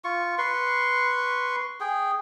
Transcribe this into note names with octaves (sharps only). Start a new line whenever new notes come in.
F4 C#6
B4 C6 C#6
G#4 G5